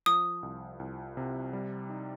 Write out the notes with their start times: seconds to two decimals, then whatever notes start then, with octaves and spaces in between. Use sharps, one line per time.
0.06 F3 D#6
0.43 C2
0.80 C2
1.17 C3
1.53 G3
1.90 D#4